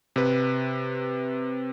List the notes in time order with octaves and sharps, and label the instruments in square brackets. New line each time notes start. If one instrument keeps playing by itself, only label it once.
[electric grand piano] C3 B4